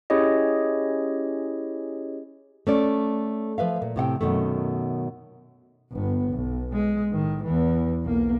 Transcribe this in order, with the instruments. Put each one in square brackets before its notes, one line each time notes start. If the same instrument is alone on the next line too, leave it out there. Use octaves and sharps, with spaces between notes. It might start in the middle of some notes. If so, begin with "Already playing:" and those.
[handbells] C#4 E4 G4 G#4 C#5 D#5
[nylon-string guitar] A3 C#4 D5
F3 B4 E5 F5
A#2
A2 C3 F#5 G5
F#2 B2 D#3 A3
[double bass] G1 B3
B1
G#3
A2 D#3
E2 E3
B1 A#3